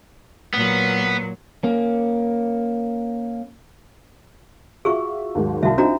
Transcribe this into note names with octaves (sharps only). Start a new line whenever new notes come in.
A#2 F#3 B3
A#3 C#4
F4 F#4 G#4 E5 C#6
D#2 G#2 F#3
C2 F#4 E5 F5 A5
C4 D4 D#4 F4 F#4 A#5